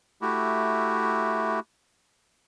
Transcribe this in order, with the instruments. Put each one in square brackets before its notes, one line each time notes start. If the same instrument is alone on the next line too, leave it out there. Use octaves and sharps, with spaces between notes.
[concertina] A3 E4 F#4 G4